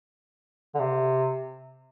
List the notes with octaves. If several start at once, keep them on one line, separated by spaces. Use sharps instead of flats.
D3
C3